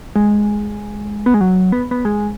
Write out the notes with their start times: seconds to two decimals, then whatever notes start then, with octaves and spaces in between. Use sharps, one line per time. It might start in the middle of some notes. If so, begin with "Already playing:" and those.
0.16 G#3
1.26 B3
1.34 G#3
1.41 F#3
1.72 B3
1.91 B3
2.05 G#3